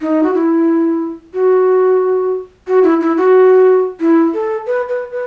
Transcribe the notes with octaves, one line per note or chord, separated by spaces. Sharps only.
D#4
F#4
E4
F#4
F#4
E4
E4
F#4
E4
A4
B4
B4
B4